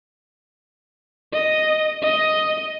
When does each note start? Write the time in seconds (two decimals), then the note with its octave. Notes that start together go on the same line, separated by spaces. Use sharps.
1.33 D#5
2.03 D#5